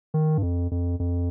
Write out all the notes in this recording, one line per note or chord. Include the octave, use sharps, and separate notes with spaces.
D#3
G2
F2
F2
F2